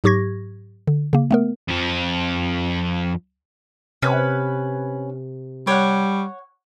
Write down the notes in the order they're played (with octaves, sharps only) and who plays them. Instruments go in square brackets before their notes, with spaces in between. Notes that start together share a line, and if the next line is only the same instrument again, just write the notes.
[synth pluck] G#2 F#3 G4 C#6 G#6 A#6
D3
C#3 A#3
A3 B3 A#4
[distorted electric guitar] F2 F3
[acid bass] C3 [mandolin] C#4 B4
[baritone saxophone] G3 [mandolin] C#5 F#5